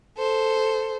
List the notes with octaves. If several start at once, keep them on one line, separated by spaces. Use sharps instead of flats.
A4 C5